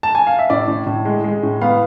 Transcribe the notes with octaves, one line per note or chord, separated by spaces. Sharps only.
A5
G#5
F5
E5
A2 D5
A2
A2
G#3
G#3
A2
B3 F5